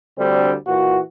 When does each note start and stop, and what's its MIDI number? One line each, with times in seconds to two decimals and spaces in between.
0.18 0.54 38
0.18 0.54 50
0.18 0.54 55
0.18 0.54 60
0.67 0.99 46
0.67 0.99 52
0.67 0.99 66